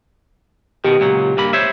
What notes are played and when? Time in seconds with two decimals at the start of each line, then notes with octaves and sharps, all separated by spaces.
0.85 B2 D#3 G4
1.00 C#2 A#2 F#3
1.37 G2 A#3 B5
1.53 C5 C#5 E5